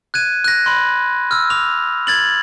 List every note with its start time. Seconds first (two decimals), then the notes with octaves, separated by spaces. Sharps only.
0.14 F#6 G#6 D#7
0.44 F#6 A#6
0.65 B5 C6 A#6
1.31 E6 F6
1.50 D6 F7
2.07 G#6 A6 F#7